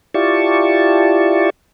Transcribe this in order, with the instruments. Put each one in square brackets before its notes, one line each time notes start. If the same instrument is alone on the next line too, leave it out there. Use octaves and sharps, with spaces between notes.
[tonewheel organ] E4 F4 G4 D5 A5 C#6